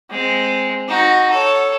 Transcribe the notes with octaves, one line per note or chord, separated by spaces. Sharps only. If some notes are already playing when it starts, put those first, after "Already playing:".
G#3 C4
D#4 F#4
A4 C#5